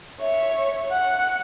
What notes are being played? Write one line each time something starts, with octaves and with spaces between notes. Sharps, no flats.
C#5 E5
F#5